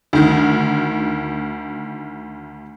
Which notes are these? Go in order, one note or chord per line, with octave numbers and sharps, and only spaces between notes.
D2 D#3